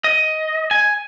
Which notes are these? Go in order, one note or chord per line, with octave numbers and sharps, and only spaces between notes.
D#5
G#5